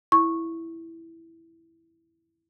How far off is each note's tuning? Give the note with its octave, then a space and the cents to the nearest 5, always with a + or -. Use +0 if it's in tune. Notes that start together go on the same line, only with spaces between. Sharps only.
E4 +0 C#6 -10